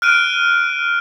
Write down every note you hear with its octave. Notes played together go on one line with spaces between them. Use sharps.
F6 F#6 D7 D#7